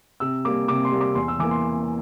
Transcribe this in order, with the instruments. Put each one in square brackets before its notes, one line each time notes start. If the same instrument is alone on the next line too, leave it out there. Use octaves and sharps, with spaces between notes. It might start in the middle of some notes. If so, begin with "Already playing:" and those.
[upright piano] C3 E6
G3 A#3 D6
C3 D6
C6
G3 A#3
D6
E2 C6
E6
E3 A#3 D6
C6